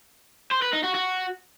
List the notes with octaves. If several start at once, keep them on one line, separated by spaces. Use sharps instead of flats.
C5
B4
D#4
F#4
F#4